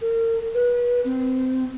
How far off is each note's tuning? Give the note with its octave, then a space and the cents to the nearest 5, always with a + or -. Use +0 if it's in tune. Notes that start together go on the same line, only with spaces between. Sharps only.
A#4 -35
B4 -30
C4 -20